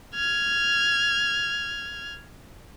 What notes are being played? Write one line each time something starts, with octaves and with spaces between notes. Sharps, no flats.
F6 G#6